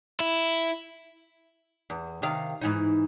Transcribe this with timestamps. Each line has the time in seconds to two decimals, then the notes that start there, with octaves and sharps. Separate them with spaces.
0.20 E4
1.90 E2
2.22 C3 D#3 F5
2.61 G#2 E3 D#4